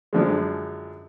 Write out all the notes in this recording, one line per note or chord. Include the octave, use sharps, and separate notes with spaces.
F#2 D3 F3 G#3